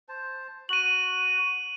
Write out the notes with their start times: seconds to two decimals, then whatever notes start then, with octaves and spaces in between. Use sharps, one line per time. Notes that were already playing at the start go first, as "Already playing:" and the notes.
0.09 C5 A5
0.69 F#4 D#7 F#7